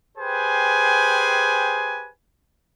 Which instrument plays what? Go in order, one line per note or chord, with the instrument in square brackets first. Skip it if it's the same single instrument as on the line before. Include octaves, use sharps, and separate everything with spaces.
[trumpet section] G4 G#4 B4 C5 G5 G#5